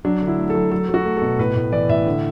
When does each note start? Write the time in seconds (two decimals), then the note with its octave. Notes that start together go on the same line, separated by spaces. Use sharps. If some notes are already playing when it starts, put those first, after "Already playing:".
0.05 F#3 D4
0.22 D3
0.27 E4
0.38 A3
0.50 A4
0.55 F#3
0.71 F#3 A4
0.89 F#3
0.94 F#4
1.05 A3
1.17 B2 A4
1.39 A2 B4
1.56 A2
1.72 E3 D5
1.89 A2 E5
2.06 D3